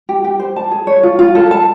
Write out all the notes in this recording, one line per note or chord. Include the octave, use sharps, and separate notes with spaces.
G4
G4
C5
A5
G#4
C#5
F4
F4
A4
A5